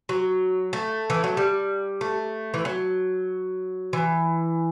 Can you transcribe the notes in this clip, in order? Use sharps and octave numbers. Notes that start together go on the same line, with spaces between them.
F#3
A3
E3
F#3
G3
A3
E3
F#3
E3